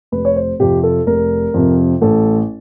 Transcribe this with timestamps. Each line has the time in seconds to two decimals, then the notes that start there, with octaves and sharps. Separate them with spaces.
0.12 F1 B4
0.25 C#5
0.36 C5
0.60 F2 C3 G4
0.83 A4
1.07 F1 A#4
1.54 F2 C3
2.01 A1 A4